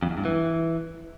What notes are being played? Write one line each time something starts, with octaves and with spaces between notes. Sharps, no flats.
F2
E2
G2
E3